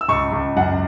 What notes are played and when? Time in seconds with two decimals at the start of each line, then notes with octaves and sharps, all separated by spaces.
0.01 E6
0.08 C#2 C#6
0.32 C#2
0.56 F#2 F#5